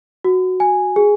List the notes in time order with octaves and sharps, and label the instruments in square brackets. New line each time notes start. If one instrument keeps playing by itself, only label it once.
[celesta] F#4
G#5
G#4